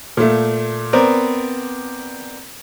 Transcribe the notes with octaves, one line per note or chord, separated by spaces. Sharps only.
A#2 A3
B3 C4 A#4 D5